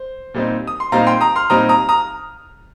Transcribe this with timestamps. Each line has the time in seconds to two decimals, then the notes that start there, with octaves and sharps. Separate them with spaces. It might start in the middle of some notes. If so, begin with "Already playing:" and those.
Already playing: C5
0.34 A#2 G3 C4 D#4
0.67 D#6
0.80 C6
0.92 A#2 G3 C4 D#4 F5 A#5
1.07 G5 C6
1.21 A#5 D#6
1.36 C6 F6
1.50 A#2 G3 C4 D#4 A#5 D#6
1.69 A#5 D#6
1.89 A#5 D#6